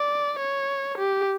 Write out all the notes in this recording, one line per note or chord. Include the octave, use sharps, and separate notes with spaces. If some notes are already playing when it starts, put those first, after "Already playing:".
Already playing: D5
C#5
G4